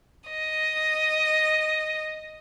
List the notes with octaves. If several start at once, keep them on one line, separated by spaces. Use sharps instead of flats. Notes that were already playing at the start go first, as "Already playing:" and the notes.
D#5